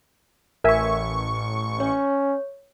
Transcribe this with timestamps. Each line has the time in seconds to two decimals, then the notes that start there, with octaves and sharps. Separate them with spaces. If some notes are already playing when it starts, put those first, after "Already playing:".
0.64 A1 A#4 E5 G#5 C#6
1.80 C#4 C#5